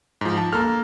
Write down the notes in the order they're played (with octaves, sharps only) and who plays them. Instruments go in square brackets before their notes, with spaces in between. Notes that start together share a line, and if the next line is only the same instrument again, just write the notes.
[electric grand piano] G#2 F3
A5
[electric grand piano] A#3 A4 [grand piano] A#5 F6